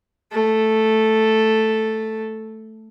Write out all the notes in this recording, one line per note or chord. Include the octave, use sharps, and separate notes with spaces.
A3 A4